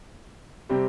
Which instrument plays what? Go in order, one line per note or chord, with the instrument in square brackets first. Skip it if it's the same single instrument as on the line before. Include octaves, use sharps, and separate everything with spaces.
[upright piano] C3 G3 C4 G4